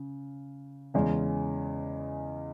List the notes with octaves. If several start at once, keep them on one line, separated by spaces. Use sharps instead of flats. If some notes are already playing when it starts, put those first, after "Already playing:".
Already playing: C#3
E2 C#3 G#3 C#4